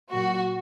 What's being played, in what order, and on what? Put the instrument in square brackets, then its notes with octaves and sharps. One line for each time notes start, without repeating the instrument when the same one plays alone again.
[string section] A#2 F#3 A#3 F#4